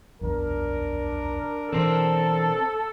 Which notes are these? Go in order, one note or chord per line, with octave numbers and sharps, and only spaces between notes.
D#1 B1 F2 D4 A#4
B2 E3 C4 A4 C5